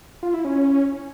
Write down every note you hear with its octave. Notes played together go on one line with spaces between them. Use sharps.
F4
E4
C#4